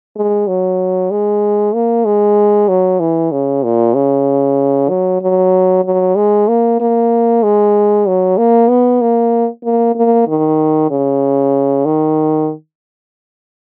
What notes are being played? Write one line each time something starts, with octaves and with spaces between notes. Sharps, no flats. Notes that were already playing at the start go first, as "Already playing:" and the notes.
G#3
F#3
G#3
A#3
G#3
F#3
E3
C#3
A#2
C#3
F#3
F#3
F#3
G#3
A#3
A#3
G#3
F#3
A#3
B3
A#3
A#3
A#3
D#3
C#3
D#3